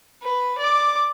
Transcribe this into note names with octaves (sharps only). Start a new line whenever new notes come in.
B4
D5 D6